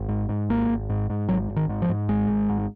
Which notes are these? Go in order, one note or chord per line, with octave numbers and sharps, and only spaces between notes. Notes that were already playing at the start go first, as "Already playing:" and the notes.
Already playing: G#1
G#2
G#2
G#1 A#3
G#1
G#2
G#2
G#1 F#3
G#1
D#3
G#2
F3
G#2
G#1 G#3
G#1
G#2